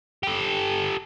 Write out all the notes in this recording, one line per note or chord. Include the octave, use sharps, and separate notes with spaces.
G4 A4